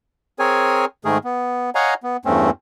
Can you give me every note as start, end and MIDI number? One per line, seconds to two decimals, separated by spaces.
0.39 0.85 60
0.39 0.85 68
0.39 0.85 70
0.39 0.85 73
0.39 0.85 80
1.05 1.18 44
1.05 1.18 51
1.05 1.18 57
1.05 1.18 68
1.05 1.18 70
1.24 1.70 59
1.75 1.94 73
1.75 1.94 75
1.75 1.94 77
1.75 1.94 78
1.75 1.94 80
1.75 1.94 82
2.03 2.17 59
2.25 2.50 40
2.25 2.50 43
2.25 2.50 57
2.25 2.50 60
2.25 2.50 61